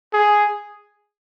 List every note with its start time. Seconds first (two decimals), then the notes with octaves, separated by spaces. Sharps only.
0.13 G#4